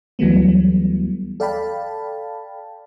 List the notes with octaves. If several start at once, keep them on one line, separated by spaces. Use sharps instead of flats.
D2 E3 F#3 G3 A3 B3
A4 D5 F5 G5 A5 B5